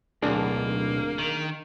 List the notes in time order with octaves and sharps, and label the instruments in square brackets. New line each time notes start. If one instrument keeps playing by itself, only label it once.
[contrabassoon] D1 [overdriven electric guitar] B1 [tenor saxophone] A#3 [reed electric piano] D4 G#4
[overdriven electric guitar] D#3